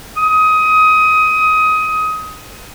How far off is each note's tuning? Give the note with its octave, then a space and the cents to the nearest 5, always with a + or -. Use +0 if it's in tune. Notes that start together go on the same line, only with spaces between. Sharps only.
D#6 +20